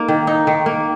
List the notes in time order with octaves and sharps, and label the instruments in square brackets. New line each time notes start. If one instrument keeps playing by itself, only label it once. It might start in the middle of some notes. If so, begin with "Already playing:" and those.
Already playing: [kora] A#3 D#4
D#3
D#4
D#3
A#3